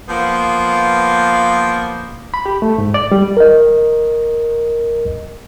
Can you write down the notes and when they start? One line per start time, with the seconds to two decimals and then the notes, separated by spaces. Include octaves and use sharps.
0.08 F3 A#3 B3
2.34 B5
2.46 G4
2.62 A3
2.78 G#2
2.94 D5
3.12 G3
3.37 A#4 D#5